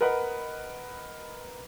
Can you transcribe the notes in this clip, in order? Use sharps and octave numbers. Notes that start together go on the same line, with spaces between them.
A#4 B4 D#5 F#5 B5